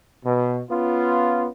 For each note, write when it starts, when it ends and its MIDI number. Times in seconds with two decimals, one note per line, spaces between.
0.25 0.61 47
0.70 1.48 59
0.70 1.48 61
0.70 1.48 65